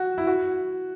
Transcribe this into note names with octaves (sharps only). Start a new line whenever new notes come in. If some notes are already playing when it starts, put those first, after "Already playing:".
Already playing: F#4
E4
F#4